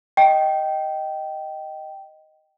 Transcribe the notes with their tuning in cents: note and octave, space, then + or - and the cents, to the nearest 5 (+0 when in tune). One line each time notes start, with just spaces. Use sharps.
D#5 +0 G5 -15